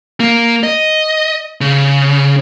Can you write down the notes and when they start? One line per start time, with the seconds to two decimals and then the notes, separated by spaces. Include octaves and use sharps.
0.20 A#3
0.63 D#5
1.61 C#3